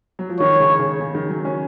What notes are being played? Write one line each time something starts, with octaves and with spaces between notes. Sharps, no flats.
F#3
F3
D#3 C#5
C#3
D#3
C#3
C#3
D#3
F#3
C#4